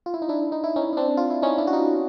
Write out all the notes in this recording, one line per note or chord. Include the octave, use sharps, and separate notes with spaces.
F4
E4
D#4
D4 E4
D#4
E4
C#4 D#4
D#4
C4 D4
F4
E4
C#4 D#4
D4 E4
F#4
D#4 F4